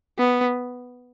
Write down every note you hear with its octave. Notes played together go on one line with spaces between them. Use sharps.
B3